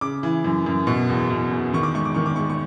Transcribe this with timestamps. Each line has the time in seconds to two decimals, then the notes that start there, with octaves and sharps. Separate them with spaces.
0.01 C#3 D6
0.23 E3
0.44 F#2
0.66 F#2
0.87 B2
1.10 E2
1.30 B2
1.51 E2
1.73 D#3 C#6
1.83 D6
1.95 G#2 C#6
2.05 D6
2.14 D#3 C#6
2.26 D6
2.36 G#2 C#6
2.49 C#6